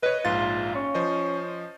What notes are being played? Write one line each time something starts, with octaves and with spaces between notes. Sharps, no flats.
B4 C#5 D#5
A#1 G#2 F4 A6
C#4
F3 C5 D#5